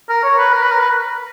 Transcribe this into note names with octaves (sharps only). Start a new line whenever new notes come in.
A#4
C#5
B4
A#4
B4
A#4
B4